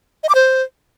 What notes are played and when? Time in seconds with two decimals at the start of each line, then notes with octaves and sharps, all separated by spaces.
0.23 D#5
0.29 D6
0.35 C5